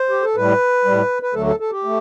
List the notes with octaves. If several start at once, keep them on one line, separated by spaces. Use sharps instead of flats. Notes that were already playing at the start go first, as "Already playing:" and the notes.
Already playing: C5
G4
A4
A2 G3 B4
A2 G3
B4
D2 D3 F#3 A3 A4
A4
A4
G4
A3